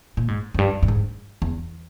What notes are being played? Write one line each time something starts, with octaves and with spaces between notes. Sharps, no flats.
A#2
G#2
F2
G2
G2
G#2
E2